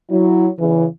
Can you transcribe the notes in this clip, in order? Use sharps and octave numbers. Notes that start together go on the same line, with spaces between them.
F#3 E4
E2 C#3 E3